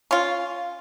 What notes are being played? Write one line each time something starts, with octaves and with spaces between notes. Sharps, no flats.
C#4 F4